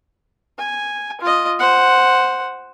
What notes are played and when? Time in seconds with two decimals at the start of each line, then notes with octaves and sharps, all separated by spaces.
0.59 G#5
1.21 F4 D#5
1.59 C5 F#5